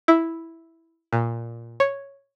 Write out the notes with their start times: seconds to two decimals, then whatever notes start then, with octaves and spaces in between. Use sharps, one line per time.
0.08 E4
1.13 A#2
1.80 C#5